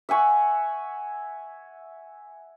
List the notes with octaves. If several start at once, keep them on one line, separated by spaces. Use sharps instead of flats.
E5 F#5 G#5 C#6